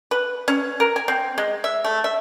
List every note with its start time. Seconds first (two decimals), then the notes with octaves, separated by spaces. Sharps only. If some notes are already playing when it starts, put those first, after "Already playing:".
0.11 B4
0.48 C#4
0.80 A#4
0.96 G#5
1.08 C4
1.38 G#3
1.64 E5
1.84 A3
2.04 E5